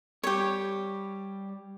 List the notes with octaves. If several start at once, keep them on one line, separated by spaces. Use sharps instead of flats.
G3 G4 C#5